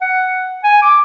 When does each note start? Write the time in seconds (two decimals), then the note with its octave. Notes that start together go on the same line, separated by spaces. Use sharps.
0.01 F#5
0.63 G#5
0.82 D6